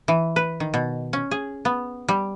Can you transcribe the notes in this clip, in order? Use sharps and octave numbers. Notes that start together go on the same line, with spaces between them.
E3
B4
D#3
B2
C#4
G#4
B3
G3